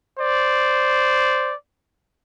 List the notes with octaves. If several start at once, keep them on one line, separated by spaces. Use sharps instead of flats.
C5 D5